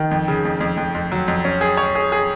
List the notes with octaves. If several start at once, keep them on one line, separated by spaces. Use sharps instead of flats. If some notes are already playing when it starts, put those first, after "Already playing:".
Already playing: D#3
F2
C#3
F2
F2
F2
F2
F#3
F2
C#4
G#4
C#5
G#4
G#4